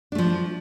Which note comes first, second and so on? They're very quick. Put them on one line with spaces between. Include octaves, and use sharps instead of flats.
D4 A3 F3